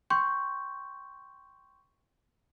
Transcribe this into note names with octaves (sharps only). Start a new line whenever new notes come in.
G5 C6 C#6 G6